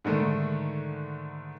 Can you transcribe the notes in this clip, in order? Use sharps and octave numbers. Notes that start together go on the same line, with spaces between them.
G#2 D3 D#3 A3